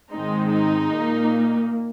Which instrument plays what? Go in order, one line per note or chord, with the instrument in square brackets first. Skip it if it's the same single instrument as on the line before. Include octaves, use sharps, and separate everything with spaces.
[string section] G#2 D#3 G#3 C4 D#4
D#4
A#2 A#3